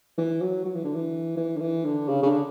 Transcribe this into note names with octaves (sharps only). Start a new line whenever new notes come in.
E3
F#3
F#3
E3
D3
E3
E3
D3
E3
D3
C#3
C#3
D3